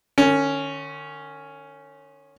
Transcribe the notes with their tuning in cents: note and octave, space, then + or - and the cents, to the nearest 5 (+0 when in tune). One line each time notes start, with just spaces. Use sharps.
D#3 -40 C#4 +0